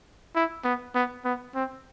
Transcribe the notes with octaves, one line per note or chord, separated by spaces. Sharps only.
E4
B3
B3
B3
C4